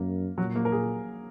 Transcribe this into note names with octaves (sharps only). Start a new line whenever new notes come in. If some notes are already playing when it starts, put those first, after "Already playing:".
Already playing: F#2 A#3
A#2 F#3
A#3
A#4
G#4